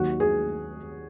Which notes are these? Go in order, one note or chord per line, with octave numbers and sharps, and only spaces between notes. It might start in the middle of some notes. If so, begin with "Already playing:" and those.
Already playing: D#2 D#3 F#3 F#4
G#4